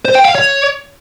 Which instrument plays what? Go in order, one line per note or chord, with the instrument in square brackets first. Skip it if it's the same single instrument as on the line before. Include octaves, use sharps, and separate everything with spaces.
[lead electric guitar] C5
G5
F5
C#5